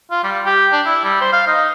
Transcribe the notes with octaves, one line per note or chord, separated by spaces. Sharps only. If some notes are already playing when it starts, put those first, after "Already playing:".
F4
G3
G4
D4
E4
G3
C5
F5
D#4